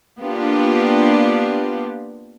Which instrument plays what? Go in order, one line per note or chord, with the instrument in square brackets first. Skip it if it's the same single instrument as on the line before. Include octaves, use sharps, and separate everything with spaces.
[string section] A#3 B3 D4 F4 G4